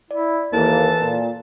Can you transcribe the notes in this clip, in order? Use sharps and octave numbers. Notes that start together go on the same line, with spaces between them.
E4 D5
D#2 E3 A#3 E4 A4 C5 A5
A#2